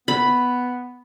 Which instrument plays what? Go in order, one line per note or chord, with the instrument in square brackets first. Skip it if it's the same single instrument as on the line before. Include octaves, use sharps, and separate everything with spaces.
[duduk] B3 [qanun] B5